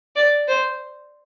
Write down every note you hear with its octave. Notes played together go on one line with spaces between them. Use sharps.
D5
C5